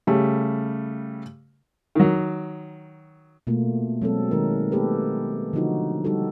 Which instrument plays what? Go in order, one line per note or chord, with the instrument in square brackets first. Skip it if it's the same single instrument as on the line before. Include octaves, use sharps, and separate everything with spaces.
[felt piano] C#3 G3 A3
[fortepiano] D#3 F#3
[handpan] B2 A3 A#3 F4
F#3 G#3 C4 A4
D#3 G#3 D#4 A#4
A3 B3 G4 A4 B4
D3 F3 F#3 D#4 F4 F#4
G3 D#4 F#4 G4 A4